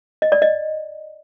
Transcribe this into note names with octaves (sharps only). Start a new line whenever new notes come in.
D#5
D5
D#5